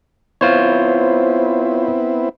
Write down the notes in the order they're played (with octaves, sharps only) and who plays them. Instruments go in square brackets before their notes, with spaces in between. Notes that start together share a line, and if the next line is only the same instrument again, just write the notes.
[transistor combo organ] B3 C4 E4 [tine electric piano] F4 C5 C#5